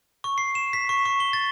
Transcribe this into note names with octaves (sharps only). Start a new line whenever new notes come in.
C#6
C7
E7
B6
C#6
C#6
G7
A6